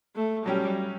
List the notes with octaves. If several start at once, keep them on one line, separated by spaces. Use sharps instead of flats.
A3
F#3 G3 C#4 G4